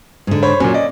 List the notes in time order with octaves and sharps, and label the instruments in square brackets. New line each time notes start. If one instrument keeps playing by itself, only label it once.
[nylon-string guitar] G#2 D3
[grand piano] C5 C#5 B5
[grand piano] A#2 F#3 [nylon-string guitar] C#4
[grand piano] D5 D#5